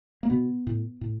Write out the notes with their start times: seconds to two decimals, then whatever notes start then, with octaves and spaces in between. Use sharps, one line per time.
0.23 A#3
0.30 B2 B3
0.67 A2
1.01 A2